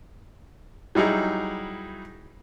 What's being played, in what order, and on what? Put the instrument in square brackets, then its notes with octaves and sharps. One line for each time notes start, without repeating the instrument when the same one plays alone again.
[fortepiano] F#3 G3 D#4 E4 G#4